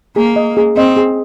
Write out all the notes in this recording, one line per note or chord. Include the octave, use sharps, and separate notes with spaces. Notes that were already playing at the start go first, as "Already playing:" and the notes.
A#3 G#4
D#5
G#4
C4 D#5
G#4